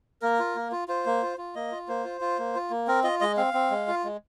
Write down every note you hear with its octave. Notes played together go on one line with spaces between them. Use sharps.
A#3 A#4
F4
A#3
F4
F4 C5
A#3
F4
F4
A#3 D#5
F4
A#3 C5
F4
F4
A#3
F4
A#3
C4 A#4
F4 D#5
G#3 D#5
C4 F5
C4
G#3
F4
G#3